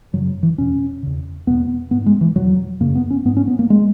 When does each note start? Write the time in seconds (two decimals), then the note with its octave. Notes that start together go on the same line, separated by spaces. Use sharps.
0.13 F#2 F#3
0.16 C#3
0.43 E3
0.58 E2 B2 C#4
1.03 E2 C#3
1.47 E2 B2 B3
1.91 G#2 B3
2.06 G#3
2.21 E3
2.36 E2 B2 F#3
2.80 F#2 C#3 A#3
2.95 B3
3.10 C#4
3.25 G#2 B3
3.37 C#4
3.47 B3
3.59 A#3
3.70 G#3